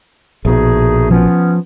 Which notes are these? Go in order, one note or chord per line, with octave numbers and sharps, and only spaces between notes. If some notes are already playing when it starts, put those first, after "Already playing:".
A#1 B2 A3 D#4 G#4
F3 B3 C#4